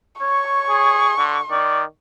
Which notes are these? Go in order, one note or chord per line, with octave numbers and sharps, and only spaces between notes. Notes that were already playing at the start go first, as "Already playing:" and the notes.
C#5 C#6
G#4
D3
D#3 D5